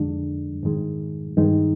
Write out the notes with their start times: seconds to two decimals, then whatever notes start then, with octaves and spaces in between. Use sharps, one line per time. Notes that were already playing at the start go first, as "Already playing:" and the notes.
Already playing: F2 D3 G#3 D4
0.63 G#2 D#3 G#3
1.37 G2 D#3 G#3 D#4